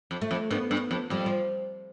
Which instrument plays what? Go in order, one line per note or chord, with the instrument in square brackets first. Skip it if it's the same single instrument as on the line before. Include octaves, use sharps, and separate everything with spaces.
[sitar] F2
[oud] A3
[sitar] F2
[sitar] G2 [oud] B3
[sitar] G2
F2
[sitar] F2 [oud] G3
[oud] F3